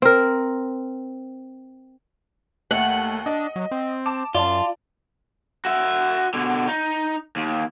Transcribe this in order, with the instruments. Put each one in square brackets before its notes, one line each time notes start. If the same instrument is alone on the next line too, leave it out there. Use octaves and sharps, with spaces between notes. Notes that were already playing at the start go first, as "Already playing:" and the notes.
[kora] C4 A#4
[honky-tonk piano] D#2 [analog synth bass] A3 [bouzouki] F#5
[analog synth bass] D4 [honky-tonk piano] D#5
[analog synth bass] F#3
C4
[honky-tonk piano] A5 D6 E7
[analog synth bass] F#2 [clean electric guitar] F4 [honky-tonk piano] D5 A5
[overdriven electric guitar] F#4 E5
B2 D3
D#4
D#2